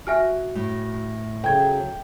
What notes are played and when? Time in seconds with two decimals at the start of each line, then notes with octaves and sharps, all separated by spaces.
0.07 F#4 E5 G#5 F6
0.55 A2
1.44 C#3 F#3 A4 G5 G#6